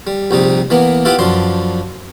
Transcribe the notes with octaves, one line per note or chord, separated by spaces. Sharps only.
G3
A#1 C3 G3 D#4
E3 A#3 B3
B3 E4 F4 G4 F#5 G5
F#2 F3 D4 C6